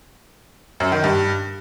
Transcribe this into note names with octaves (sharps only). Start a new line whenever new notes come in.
F#2
D#3
G2